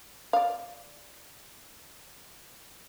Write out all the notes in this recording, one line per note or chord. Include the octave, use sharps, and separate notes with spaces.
D5 F5